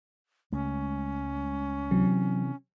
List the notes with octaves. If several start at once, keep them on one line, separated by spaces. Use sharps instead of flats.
C#2 G#3 A3 C#4
C3 E3 F#3